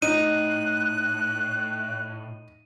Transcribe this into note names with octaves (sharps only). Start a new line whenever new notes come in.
A2 D#4 F#6 D#7